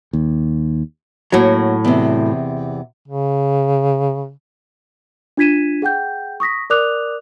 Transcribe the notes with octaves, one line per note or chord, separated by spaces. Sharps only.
D#2
A2 F#3 A#3 F#4
E2 C3
C#3
D4 F4 G#6 B6 D#7 E7
G#4 F#5 G5 G6
C#6 D#6 A#6 B6
A#4 D5 D6 D#6 F#6 F7